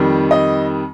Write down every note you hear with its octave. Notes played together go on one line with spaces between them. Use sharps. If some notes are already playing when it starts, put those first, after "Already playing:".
Already playing: F2 D#3 G3
D#5